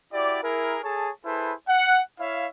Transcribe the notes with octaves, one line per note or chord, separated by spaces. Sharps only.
E4 F#4 G4 D5
E4 G#4 A#4
G#4 A4 C#5 A5
E4 G#4 A4 B4 C5
F#5
E4 C#5 E5 F5